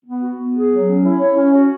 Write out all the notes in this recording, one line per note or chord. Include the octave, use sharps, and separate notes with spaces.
B3
F#4
B3
G#4
F#3
C#4
E4
C#5
C#4
F#4